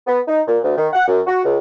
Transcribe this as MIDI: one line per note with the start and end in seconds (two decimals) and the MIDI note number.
0.07 0.19 59
0.26 0.41 63
0.46 0.58 46
0.63 0.73 38
0.76 0.88 51
0.93 1.05 78
1.07 1.20 42
1.27 1.39 66
1.44 1.58 37